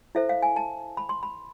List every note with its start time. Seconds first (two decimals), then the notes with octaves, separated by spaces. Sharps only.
0.15 E4 A4 C5 E5
0.29 F5
0.42 G#5
0.56 A5
0.97 B5
1.09 C6
1.23 B5